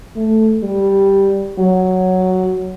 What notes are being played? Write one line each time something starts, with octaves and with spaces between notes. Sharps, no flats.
A3
G3
F#3